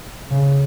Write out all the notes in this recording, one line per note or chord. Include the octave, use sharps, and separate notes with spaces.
C#3